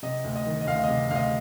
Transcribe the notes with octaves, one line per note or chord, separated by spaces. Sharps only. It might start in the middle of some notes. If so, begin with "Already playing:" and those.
C3 D#5
D2
D#5
D#3
D#5
D2 F5
C3 D#5
D2 D#5 F5